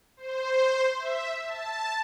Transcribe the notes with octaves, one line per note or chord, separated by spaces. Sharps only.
C5
E5
A5